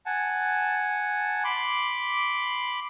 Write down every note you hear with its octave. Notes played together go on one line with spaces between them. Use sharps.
F#5 G#5 A5
B5 C6 D6